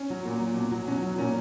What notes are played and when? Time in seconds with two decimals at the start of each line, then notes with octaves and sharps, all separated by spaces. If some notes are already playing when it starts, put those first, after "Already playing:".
Already playing: C#4
0.10 F#3
0.25 A#2
0.40 F#3
0.57 B2
0.71 F#3
0.88 B2 C#4
1.02 F#3
1.18 A#2 C#4